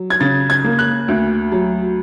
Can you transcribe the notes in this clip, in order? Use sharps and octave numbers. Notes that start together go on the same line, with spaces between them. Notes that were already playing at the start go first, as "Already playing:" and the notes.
Already playing: F#3
G#6
C#3 A6
G#6
A#3
F#6
D2
F#3